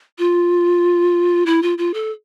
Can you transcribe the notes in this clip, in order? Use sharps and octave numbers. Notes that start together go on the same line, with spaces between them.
F4
E4
F4
F4
A4